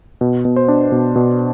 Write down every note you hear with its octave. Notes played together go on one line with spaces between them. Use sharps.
B2
B2
C5
D4
B2
B2